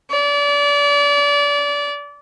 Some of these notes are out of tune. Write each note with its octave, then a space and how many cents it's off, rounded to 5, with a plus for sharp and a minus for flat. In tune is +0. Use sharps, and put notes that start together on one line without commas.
D5 -30